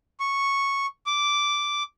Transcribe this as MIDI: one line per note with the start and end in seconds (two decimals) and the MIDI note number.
0.20 0.86 85
1.06 1.83 86